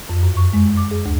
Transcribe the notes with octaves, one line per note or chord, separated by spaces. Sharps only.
F2
F#2
C#6
G#3
D6
G#4
D2